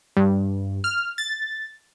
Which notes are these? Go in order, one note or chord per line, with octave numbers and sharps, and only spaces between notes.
G2
F6
A6